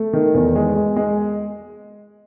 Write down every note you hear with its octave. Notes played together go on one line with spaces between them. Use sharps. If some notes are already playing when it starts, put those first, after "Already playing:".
Already playing: A3
D#3
E2
G#3
G#3
G#3